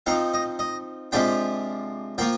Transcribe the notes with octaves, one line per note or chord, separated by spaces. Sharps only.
F3 C4 D#4 F5
D#5
D#5
C3 F3 G#3 D4 F4 G5
F3 A#3 F4 G5